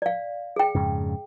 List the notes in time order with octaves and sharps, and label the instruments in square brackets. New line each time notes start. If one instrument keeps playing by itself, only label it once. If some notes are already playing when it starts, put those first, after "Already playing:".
[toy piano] D5 F5
G#4 G5
[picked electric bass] F2 G#2 C#3